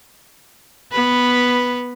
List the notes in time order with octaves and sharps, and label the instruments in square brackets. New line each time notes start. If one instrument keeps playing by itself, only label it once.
[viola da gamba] B3 B4